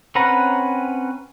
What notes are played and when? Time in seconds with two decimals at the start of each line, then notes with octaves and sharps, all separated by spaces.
0.15 C4 C#4 B4 F#5 A#5